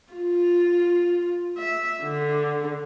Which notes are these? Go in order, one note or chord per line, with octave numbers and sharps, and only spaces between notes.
F4
E5
D3